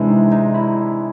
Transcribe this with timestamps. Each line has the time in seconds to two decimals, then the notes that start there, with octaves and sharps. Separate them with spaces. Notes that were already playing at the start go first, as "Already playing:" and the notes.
Already playing: C3 E3 G#3 D4 E4
0.09 D#4
0.32 D#4
0.54 E4